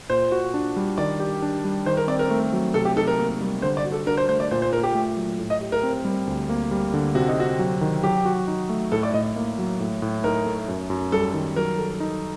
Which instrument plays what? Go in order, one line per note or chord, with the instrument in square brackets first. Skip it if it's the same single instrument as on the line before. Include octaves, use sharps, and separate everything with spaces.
[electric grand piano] A#2 [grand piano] C5
[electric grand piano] F#4
D4
G3
[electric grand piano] D#3 [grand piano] D5
[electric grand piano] G4
D4
G3
[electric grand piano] D#3 [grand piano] C5
[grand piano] A#4
[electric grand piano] C4 [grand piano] D5
[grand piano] A#4
[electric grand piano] A3
F#3
[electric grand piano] C3 [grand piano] A4
[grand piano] G4
[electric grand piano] D#4 [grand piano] A4
[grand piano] A#4
[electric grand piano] A#3
G3
[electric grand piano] D3 [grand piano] C5
[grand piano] D5
[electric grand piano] F#4
[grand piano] A4
[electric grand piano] D4 [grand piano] A#4
[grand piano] C5
[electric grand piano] A3 [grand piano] C5
[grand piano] D5
[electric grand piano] A#2 [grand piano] C5
[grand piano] C5
[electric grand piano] A#2 [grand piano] A#4
[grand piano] G4
[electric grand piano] A3
F#3
A2
[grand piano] D#5
[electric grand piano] G4
[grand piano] A#4
[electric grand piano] C4
G3
D2
A#3
G3
D3
[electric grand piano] C3 [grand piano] F#4
[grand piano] D#4
[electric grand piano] C4 [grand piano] F#4
[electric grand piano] F#3
D#3
[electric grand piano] F#3 [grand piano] G4
[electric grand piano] F#4
D#4
A3
[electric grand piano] A2 [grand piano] A4
[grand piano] D5
[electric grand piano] A2 [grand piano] D#5
[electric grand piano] A#3
F#3
A2
A2
[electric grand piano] D#4 [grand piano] A#4
[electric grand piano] A3
F#2
F#2
[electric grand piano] G3 [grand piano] A4
[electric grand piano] D#3
[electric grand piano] F#3 [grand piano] A#4
[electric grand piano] A4
D#4